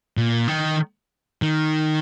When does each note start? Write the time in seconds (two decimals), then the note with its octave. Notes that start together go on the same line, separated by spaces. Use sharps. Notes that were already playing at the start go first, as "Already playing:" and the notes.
0.17 A#2
0.48 D#3
1.42 D#3